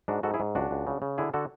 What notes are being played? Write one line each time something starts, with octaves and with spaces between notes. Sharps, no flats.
G#2 D4 F#4
G#2 F#4 A4
E4 G#4
G#2
C#2 D4 F#4
C#2
C#3
C#3
D3 E4 G#4
D3 F#4 A4